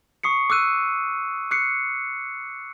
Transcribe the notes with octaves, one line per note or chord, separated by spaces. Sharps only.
C#6 D#6 C7 C#7
D6 E6 F#6 D#7
D6 F#6 C7 C#7